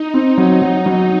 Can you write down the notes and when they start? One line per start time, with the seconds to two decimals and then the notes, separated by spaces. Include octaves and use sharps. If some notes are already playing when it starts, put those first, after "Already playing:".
Already playing: D#4
0.14 C4 D#4
0.38 F#3
0.62 F#3
0.86 F#3